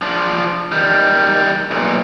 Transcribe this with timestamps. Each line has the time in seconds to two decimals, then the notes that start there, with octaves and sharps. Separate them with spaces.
0.02 F3 D4
0.72 D#3 G3
1.71 B1 A#2